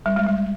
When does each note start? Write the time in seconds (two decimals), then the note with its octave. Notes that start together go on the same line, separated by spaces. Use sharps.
0.06 G3
0.16 G#3
0.26 G3